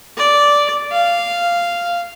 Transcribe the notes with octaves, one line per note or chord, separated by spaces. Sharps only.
D5
F5